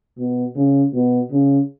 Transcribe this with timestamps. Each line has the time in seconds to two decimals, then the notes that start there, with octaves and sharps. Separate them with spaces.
0.18 B2
0.56 C#3
0.94 B2
1.31 C#3